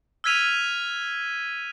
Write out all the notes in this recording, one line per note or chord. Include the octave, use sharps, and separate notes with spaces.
E6 F6 G#6 B6 D#7 F7